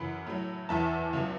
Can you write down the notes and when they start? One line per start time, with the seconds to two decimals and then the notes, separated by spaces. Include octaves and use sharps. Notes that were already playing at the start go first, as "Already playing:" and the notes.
Already playing: F#2 C#3 E3 F#5 B5
0.26 A2 F#3
0.69 E2 E3 E5 A5
1.13 C#2 B2 F#3